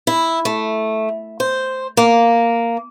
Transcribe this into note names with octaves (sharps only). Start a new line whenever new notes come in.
E4
A3
C5
A#3